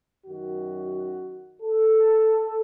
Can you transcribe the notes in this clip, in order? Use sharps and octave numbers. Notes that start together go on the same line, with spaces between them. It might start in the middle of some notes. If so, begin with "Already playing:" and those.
F#2 D#3 F#4
A4